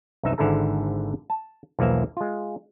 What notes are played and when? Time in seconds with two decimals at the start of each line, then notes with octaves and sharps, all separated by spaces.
0.23 C2 F#2 D4 D#4 B4 E5
0.38 G#1 G#2 D3 E4 A4 A#5
1.30 A5
1.79 B1 E2 F3 A#3 E5
2.17 G#3 F4